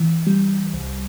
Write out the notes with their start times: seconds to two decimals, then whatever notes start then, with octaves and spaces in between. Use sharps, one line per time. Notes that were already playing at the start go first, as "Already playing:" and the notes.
Already playing: E3
0.27 G3
0.73 C2